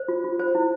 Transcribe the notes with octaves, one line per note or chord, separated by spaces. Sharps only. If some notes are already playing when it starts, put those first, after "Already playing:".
Already playing: C5
F4
F4
C5
E4